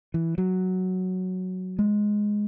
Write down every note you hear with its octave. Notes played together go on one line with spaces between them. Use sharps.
E3
F#3
G#3